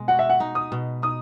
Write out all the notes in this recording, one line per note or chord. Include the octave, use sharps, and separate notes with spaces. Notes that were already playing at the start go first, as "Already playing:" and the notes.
Already playing: B2 G#3
F#4 F#5
E5
F#5
D#4
D#6
B2
D#4 D#6